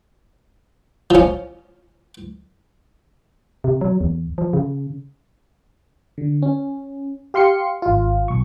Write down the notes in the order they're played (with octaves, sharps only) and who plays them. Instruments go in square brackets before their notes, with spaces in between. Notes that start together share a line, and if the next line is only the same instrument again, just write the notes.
[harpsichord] F3 C#4
[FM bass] C3
F#3
E2
F3
C#3
[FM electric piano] D3
C#4
G4 F5 C6 C7 C#7
G#1 F4
B1 C#6